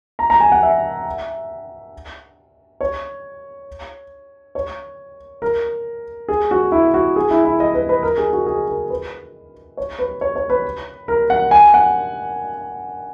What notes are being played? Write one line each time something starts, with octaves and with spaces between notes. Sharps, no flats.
A#5
A#5
G#5
F#5
E5
C#5
C#5
A#4
G#4
F#4
E4
F#4
G#4
E4
E4
D#5
B4
B4
A#4
G#4
F#4
G#4
A#4
B4
C#5
B4
C#5
C#5
B4
A#4
F#5
G#5
F#5